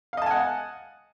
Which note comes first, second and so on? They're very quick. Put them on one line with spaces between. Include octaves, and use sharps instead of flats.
F5 D#5 A5 G#5 F#5